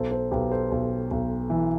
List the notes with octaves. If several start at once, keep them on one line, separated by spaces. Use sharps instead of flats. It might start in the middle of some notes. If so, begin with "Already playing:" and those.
Already playing: B1 A4 C5
A4 C5
B1 G4 B4
A4 C5
B1
B1
E3